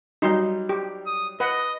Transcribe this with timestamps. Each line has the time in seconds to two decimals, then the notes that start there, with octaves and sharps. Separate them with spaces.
0.22 F#3 G3 D#4 C6
0.69 G4
1.06 D#6
1.40 B4 D#5 F#5